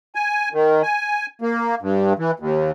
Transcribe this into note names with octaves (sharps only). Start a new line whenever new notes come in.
G#5
D#3
G#5
A#3
G2
E3
D#2